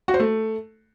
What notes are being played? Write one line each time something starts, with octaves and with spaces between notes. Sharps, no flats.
F#4
C5
A3